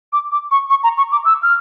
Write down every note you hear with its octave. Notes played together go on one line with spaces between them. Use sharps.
D6
D6
C#6
C#6
A#5
C#6
D6
E6
F6